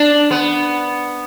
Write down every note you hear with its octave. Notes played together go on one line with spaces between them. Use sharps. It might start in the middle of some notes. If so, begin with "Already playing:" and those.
Already playing: D4
B3